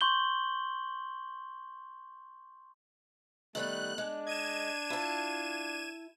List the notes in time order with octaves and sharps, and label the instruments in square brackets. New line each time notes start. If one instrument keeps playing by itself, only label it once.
[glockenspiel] C6 C#6 G6 F#7 G7
[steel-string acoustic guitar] D#3 G3 B3 [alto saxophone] A3 [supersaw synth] F#6
[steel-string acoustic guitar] G#3 [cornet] D4
[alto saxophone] D#5 [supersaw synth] G#6 D#7 E7
[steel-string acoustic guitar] E4 A5 [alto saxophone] F4